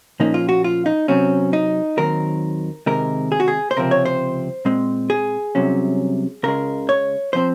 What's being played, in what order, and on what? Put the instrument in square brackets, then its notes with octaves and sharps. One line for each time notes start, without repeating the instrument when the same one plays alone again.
[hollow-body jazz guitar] A#2 F3 A#3 C#4 D#4
F4
F#4
F4
D#4
C3 F#3 C4 C#4
D#4
D#2 D#3 F#3 C4 A#4
C3 D#3 G#3 A#4
G#4
F#4
G#4
C5
C#2 C3 F3 C4 A#4
C#5
C5
A#2 G#3 C4
G#4
C2 C3 F#3 C#4
C#2 C#3 G#3 A#4
C#5
F3 C4 C5